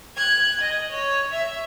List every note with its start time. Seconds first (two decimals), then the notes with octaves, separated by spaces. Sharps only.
0.16 F#6 G#6
0.61 D#5
0.92 C#5
1.33 E5